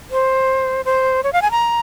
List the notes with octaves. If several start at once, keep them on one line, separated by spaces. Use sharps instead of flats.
C5
C5
C#5
F5
G#5
A#5